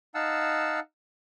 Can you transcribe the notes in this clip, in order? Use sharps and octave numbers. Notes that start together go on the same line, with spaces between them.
D#4 F5 F#5 A5 E6